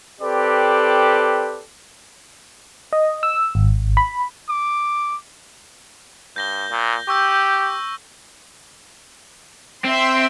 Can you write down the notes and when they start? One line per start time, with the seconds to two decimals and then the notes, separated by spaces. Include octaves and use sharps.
0.21 C4 G4 A4 B4 D5
2.93 D#5
3.23 E6
3.55 G#1
3.97 B5
4.49 D6
6.36 G2 G6 A#6 G7
6.70 A#2
7.08 G4 C#6 E6 G6
9.85 C4 E5 C6